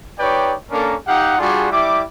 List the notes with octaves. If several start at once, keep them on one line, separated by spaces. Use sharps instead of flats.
D#4 G4 B4 C#5 D5 G5
A#3 C#4 D4 A4 A#4
D#4 G4 F5 F#5
G3 D4 F4 F#4 G#4
G3 E4 D6